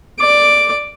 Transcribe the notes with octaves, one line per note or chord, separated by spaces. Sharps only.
D5 D6